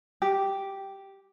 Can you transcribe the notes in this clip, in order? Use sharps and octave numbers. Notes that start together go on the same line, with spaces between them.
G4